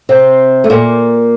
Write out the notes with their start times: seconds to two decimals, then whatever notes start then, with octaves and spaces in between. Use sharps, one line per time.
0.09 C3 C4
0.64 A3
0.70 A#2 A#3